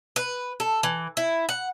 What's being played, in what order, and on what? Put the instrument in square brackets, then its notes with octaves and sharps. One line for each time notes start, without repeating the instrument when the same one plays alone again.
[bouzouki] B4
A4
E3
E4
F#5